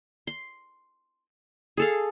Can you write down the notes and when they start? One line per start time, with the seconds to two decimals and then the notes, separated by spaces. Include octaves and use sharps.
0.27 C6
1.77 G#4 A4 F5